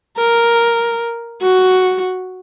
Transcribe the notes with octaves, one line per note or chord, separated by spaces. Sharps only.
A#4
F#4